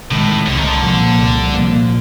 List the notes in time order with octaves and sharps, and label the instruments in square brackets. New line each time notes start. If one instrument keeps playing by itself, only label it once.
[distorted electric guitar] A2 [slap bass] C3 D#3 G#3
[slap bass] C2 [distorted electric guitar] D3
[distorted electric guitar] D#3
D3
[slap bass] A#2 F3 A#3
C2
A#2 F3 A#3